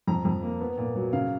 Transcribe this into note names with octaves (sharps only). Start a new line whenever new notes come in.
F2 A#5
F2
A#3
B3
A#2
F#3
C#3 F5